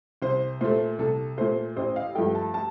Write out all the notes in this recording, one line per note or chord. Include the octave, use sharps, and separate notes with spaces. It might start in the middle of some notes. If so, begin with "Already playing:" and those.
C2 C5
A#2 A3 C5
C2 A4
A#2 A3 C5
A1 C5
F5
G2 F3 A3 G5
A5
A5